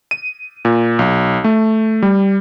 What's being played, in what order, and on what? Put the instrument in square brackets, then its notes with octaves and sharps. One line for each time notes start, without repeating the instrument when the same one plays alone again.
[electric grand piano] D#7
A#2
B1
A3
G3